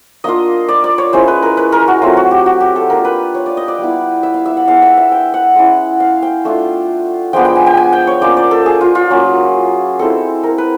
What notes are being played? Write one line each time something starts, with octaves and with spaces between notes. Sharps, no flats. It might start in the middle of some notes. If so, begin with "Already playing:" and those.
A#3 D4 F4 D#5
D5
D5
C#5
G#3 C#4 E4 C5
B4
A#4
B4
A#4
F#4
F#3 A3 C4 F4
F#4
G4
F#4
G4
A4
A#3 D4 F4 A#4
B4
C#5
D5
D#5
D5
G3 B3 E4
E5
F5
E5
F#5
G#3 B3 E4 F5
E5
E5
G5
F#5
G#3 C#4 E4
F5
G5
A3 D4 F4
F3 G#3 B3 D4 G5
G5
G#5
G5
G#5
G5
C#5
A#3 C#4 F4 D5
D5
A4
G#4
F4
F4
F#3 A#3 C#4
G#3 C4 E4 A4
A#4
B4